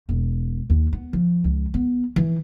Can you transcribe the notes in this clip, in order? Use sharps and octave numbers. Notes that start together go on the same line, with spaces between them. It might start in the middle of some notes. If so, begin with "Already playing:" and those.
E1
D#2
B3
F3
C#2
B3
E3